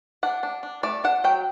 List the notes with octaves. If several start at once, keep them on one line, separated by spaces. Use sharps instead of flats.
D4 F#5
D4
D4
A3 D5
D4 F#5
F#3 G5